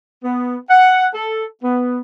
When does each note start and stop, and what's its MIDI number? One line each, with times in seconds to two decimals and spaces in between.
0.24 0.59 59
0.70 1.06 78
1.14 1.46 69
1.64 2.01 59